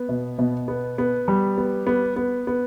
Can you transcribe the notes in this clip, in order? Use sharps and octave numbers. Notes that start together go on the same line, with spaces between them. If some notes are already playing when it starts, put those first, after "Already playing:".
Already playing: B3
B2
B2
B3
B3
G3
B3
B3
B3
B3